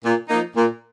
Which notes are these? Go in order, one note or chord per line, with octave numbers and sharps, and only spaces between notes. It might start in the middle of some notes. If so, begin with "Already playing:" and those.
A#2
F3 A#3 D#4
A#2